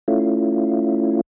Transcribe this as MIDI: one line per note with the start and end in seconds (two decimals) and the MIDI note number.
0.08 1.21 57
0.08 1.21 61
0.08 1.21 64
0.08 1.21 65